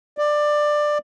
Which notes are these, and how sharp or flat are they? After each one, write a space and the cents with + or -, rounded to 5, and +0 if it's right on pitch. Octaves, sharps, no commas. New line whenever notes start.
D5 +15